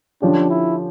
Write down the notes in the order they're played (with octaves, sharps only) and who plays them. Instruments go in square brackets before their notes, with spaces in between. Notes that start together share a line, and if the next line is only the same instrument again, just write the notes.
[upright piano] D3 F3 C#4 G4 [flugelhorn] D4
[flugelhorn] E4